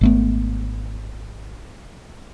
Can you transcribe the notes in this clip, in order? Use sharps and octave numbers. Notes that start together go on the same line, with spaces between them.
G#1 A3 B3